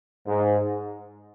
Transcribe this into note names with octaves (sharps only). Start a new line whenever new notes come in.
G#2